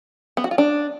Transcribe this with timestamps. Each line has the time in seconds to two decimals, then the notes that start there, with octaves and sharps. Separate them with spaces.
0.37 B3
0.44 F#4
0.51 F4
0.58 D4